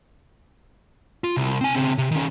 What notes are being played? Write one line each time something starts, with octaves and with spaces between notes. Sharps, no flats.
F4
C2
C4 G#5
C#3 C4
C3
D#3 C#4